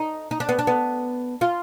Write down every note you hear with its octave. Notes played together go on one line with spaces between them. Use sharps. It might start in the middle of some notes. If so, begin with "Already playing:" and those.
Already playing: D#4
D#4
D4
B3
D4
B3
F4